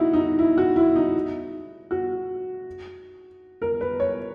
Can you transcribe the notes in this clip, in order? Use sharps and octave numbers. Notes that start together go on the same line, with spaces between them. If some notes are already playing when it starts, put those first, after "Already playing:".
Already playing: D#4 E4 F#4
D#4
E4
F#4
E4
D#4
F#4
A#4
B4
C#5